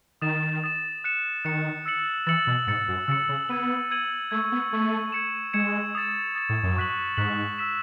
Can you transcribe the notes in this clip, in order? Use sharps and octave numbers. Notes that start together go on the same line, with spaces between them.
D#3 D#6 A6 E7
D#6 A6 E7
F#6 C#7 E7
D#3 F#6 C#7 E7
E6 A6 C#7 F#7
E3 E6 A6 C#7 F#7
B2
G#2 E6 A6 C#7
F#2
C#3 E6 A6 C#7
C#3
B3 E6 G#6 D#7 F#7
E6 G#6 D#7 F#7
A3 C#6 E6 G#6
B3
A3 C#6 E6 G#6
G#6 C#7 E7
G#3 G#6 C#7 E7
D#6 A6 E7
D#6 A6 E7
A2
F#2
C#6 F#6 B6 F#7
G#2 C#6 F#6 B6 F#7
E6 B6 E7